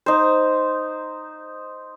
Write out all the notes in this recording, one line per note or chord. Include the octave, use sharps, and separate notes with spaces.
D#4 C5